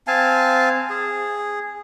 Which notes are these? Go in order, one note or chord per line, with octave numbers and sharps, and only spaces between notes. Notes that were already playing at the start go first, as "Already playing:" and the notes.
C4 F5 G#5 A5
G#4